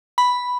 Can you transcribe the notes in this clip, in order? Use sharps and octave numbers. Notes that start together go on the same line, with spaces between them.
B5